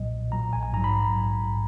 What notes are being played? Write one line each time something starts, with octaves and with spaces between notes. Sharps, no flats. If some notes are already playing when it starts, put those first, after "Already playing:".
Already playing: B1 A#2 F#3 D#5
B1
A#2 F#3 A#5
A#1 G#5
G#5
G#2 F#3 A#5
B5